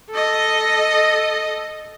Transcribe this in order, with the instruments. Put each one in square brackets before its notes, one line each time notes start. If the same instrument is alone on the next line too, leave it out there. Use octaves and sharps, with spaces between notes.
[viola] A4 D#5